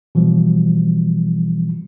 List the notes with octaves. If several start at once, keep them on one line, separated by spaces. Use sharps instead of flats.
B2 E3 F3 G3